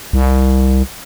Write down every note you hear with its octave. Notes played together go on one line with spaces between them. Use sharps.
C2